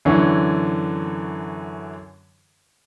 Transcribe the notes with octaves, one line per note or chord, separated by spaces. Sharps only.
F#2 D3 E3 C#5